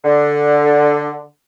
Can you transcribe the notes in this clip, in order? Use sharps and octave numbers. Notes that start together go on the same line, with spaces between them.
D3